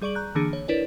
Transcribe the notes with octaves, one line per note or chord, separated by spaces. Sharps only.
G3 G#4 D5 C#6 D7 F#7
A#5 F#6 G6
D3 E3 A#3 D4 G#4 C#7
C#5
D4 E4 A#4 B4 C#5 D5